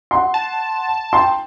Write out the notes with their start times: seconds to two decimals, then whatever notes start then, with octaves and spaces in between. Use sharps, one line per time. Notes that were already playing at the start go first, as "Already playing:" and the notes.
0.11 F#5 C6
0.34 A5
1.13 G5 C6